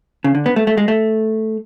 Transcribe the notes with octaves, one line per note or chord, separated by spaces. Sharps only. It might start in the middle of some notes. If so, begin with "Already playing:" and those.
C#3
D3
B3
A3
A3
G#3
A3